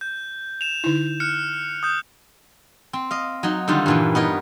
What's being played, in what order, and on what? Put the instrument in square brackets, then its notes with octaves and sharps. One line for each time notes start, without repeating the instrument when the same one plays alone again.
[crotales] G6
E7 F7
[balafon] D3 D#4 E4
[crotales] F6 F#6 C#7
D#6 G6
[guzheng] C4
D#5 F5
F#3 D#4
D3 D#3 G3 F4
G2 A#2 E3
B3 D#4 A#4 C#5